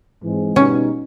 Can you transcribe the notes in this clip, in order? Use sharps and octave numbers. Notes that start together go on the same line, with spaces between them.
G#2 E3 G#3 C4
B2 G3 B3 C#4 D#4